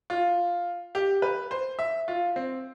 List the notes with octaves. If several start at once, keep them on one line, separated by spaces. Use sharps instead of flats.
F4
G4
B4
C5
E5
F4
C4